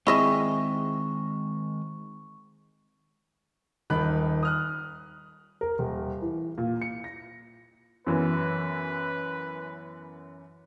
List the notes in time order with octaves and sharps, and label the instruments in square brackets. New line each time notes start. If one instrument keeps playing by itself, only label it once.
[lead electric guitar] D#3 G#3 [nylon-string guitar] C4 G#4 [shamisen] E4 D#5 E5 [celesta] C#6
[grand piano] D#1 D#3 B5 F#6
D#6 F6 F#6
[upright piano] A#4
D#1
E3
A#2
C#7
A#6
[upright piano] F#2 E3 B3 [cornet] B4